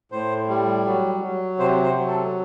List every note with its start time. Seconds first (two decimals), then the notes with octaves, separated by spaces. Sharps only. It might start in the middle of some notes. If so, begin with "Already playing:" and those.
0.12 A2 C5
0.49 G3
0.85 F#3
1.22 F#3
1.59 C3 C5
1.83 C5
1.95 F#3
2.08 A4